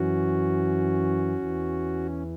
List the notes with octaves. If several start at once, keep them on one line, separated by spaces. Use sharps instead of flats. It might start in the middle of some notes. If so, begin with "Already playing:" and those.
Already playing: F#2 E3 C#4 F#4
E2 E3